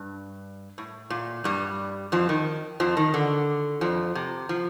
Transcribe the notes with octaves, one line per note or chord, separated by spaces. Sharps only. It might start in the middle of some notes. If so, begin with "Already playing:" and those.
Already playing: G2
A2
A#2
G2 G3
F2 F3
D#3
F2 F3
D#3
D3
F2 F3
C3
F3